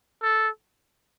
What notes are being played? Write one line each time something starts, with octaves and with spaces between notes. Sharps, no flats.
A4